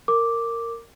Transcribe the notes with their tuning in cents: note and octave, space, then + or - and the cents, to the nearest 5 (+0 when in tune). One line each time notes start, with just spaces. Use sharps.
A#4 -15 D6 -5